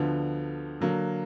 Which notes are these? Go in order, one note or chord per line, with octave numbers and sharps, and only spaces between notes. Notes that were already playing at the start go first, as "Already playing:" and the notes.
Already playing: D2 D3 F3 B3
D3 F#3 A#3